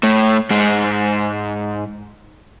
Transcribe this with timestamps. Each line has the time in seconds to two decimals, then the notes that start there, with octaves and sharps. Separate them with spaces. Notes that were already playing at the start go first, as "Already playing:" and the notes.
0.03 A2 A3
0.50 G#2 G#3